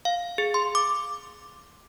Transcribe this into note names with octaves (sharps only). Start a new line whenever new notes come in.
F5
G#4
C6
D6